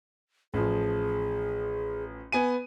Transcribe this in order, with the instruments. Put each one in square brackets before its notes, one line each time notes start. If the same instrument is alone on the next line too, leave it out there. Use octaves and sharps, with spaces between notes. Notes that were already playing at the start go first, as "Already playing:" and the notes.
[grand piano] A1 F3 [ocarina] G#4
[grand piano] B3 G#5 D#7